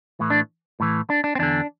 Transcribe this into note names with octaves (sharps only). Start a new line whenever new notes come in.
A2 E3
D4
A2 E3
D4
D4
C4
E2 D3 D4